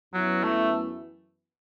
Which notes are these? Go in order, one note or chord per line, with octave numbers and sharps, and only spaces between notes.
F#2 E3 F#3 B3 E4
A3